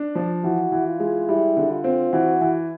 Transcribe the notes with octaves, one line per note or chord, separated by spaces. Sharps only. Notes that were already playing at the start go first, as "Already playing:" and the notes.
Already playing: D4
F3
E3 F#4
E3
F4
G#3
G3 E4
D3
F4
C4
E3 F#4
E3